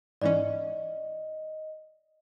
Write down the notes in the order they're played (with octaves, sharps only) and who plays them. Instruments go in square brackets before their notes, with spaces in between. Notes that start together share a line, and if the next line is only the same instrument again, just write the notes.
[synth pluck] G#2 E3 C#4 [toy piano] D5 [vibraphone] D#5